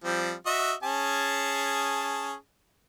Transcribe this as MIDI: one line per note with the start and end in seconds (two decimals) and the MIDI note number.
0.04 0.32 53
0.04 0.32 55
0.04 0.32 60
0.46 0.73 66
0.46 0.73 75
0.46 0.73 76
0.83 2.34 61
0.83 2.34 68
0.83 2.34 81